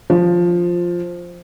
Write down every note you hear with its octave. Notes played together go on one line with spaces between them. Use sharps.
F3